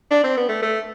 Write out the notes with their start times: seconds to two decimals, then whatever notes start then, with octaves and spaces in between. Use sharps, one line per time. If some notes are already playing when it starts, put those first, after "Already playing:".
0.11 D4
0.24 C4
0.37 B3
0.48 A3
0.62 A3